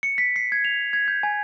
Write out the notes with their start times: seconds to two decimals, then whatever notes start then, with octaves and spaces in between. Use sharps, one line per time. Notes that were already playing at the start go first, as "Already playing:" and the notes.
0.03 C#7
0.18 B6
0.36 C7
0.52 G#6
0.65 F7
0.93 G#6
1.08 G6
1.23 G#5